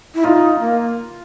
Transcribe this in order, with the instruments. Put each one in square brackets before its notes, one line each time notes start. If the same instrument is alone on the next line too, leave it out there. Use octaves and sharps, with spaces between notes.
[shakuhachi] E4
[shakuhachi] D#4 [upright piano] F4
[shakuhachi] A#3